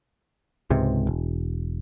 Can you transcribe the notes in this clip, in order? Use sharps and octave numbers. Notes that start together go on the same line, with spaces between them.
C#2 G#2 C3
E1